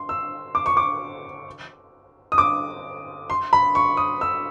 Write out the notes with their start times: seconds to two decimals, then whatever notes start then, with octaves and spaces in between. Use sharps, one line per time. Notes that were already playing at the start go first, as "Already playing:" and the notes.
Already playing: C6
0.09 E6
0.55 D6
0.66 C#6
0.77 D6
2.32 D#6
2.38 D6
3.30 C6
3.53 B5
3.75 C#6
3.97 D#6
4.21 E6